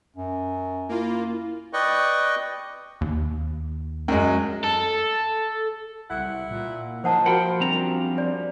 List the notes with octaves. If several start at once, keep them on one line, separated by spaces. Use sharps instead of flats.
F#2
A#3 E4 F4
B4 D5 D#5 G5 C#6
D#2
F#2 G#3
A4
C2 E4 F#5
A#2
F3 A#3 D#4 C5 F#5 A5
A#3 F#4 A#4 C5 F#5 G5 B5
F#2 G3 C4 D4 A#5
D5